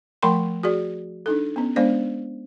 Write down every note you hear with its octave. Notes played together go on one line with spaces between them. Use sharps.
F3 A3 A#4 G5 B5 C6
F#4 G#4 D5
D4 D#4 A4
B3 C#4
G#3 B3 D4 C5 D5